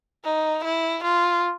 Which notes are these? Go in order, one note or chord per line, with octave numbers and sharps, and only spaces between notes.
D#4
E4
F4